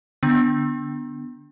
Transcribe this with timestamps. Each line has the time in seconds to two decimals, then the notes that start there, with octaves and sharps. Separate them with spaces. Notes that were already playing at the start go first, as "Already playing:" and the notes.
0.23 D3 B3 D4